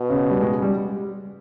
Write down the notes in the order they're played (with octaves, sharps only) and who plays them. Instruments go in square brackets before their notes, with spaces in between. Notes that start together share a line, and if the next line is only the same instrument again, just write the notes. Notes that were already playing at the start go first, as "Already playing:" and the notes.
Already playing: [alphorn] B2
[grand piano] C#3
G3
G#3
G3